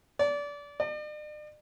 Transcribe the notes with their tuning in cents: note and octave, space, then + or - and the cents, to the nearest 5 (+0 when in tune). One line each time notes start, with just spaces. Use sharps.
D5 -25
D5 +45